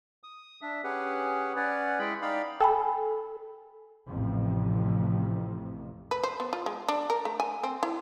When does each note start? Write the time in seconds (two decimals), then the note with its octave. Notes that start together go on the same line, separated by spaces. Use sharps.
0.23 D#6
0.62 D4 E5
0.84 C#4 G4 G#4 B4 F#5
1.56 C#4 B4 C#5 D5 F#5
1.99 G#3 E4 G#4 G5 B5
2.22 D#4 D5 F5 G5 B5
2.60 A4 G5 G#5 B5
4.07 A1 F2 C3
6.11 B4
6.24 C5
6.40 B3
6.53 F4
6.66 G#3
6.88 D4
7.10 A#4
7.25 A3
7.40 G#5
7.63 C4
7.83 E4